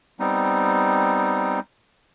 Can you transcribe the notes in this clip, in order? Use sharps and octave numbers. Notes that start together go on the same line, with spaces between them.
G3 B3 C4 D#4